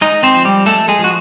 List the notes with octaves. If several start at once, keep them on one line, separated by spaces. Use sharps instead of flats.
G#3 D#4 D#5
C4 C5
F3
G3 G4
G#3 A3 A4
G#3 G#4
F3
F#4